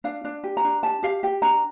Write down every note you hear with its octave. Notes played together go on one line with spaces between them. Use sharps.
D4 F5
D4
G4
A#5
D4
G4 A5
G4 F5
G4 G5
D4 A#5